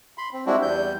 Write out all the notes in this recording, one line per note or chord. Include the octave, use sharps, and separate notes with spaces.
B5 C6
C4
G3 G#3 C4 D4 E4 F#4
E2 G3 G6